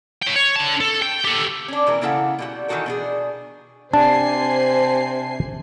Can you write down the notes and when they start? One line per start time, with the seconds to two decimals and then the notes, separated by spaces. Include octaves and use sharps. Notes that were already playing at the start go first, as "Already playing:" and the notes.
0.23 C#5 G5
0.36 C#5
0.56 D3 A5
0.80 A4
1.02 G5
1.25 G4 A4
1.68 C#4 D4
1.87 B2 E3 A#4
2.01 C#3 A#3 E4 A4 F5 F#5
2.39 B2 G3 F#4
2.68 D#3 E3 D#4 F#4 A4 A#4
2.86 B2 D4 G#4
3.93 C3 D4 C5 G#5 A5 C7